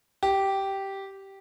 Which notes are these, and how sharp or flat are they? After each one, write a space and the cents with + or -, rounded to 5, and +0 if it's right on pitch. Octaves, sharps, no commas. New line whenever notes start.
G4 -10